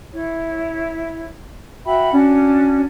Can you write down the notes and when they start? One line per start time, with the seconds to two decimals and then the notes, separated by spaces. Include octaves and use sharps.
0.12 E4 C#5
1.85 F#4 E5 G5 B5
2.12 C#4 D4 F#4